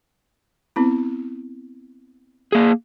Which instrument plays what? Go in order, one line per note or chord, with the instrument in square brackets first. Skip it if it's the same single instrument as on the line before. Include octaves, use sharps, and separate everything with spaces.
[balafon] B3 C4 E4
[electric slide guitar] A#3 G#4